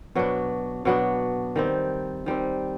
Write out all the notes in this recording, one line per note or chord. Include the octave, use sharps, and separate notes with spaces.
B2 F#3 B3 D4
B2 F#3 B3 D4
D#3 G3 C4
D#3 G3 C4